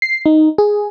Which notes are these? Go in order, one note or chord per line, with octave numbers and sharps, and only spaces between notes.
C7
D#4
G#4